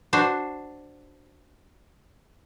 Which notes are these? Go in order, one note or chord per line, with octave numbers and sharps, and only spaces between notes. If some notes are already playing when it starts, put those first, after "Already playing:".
D4 F#4 C5